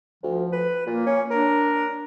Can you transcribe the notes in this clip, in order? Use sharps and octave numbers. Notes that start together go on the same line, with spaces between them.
D2 F3
B4
A#2 A#3
C#4
D4 A#4